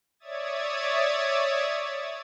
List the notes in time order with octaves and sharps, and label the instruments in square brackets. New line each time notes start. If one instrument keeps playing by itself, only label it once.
[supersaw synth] C#5 D5 E5 D#6 G#6 A6